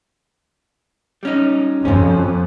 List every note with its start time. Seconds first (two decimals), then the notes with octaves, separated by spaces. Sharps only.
1.23 G3 C#4 D#4
1.85 F2 B2 C#4